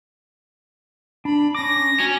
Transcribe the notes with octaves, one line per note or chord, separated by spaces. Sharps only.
D4 B5
C#4 D6 A#6
C#4 F#4